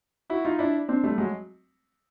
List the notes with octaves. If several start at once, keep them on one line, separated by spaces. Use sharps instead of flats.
E4 F#4
D#4 F4
D4 E4
C4 D4
G3 A3
F#3 G#3